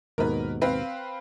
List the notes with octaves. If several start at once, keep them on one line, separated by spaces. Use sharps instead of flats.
D#2 G#2 B2 A#4 B4
C4 B4 F5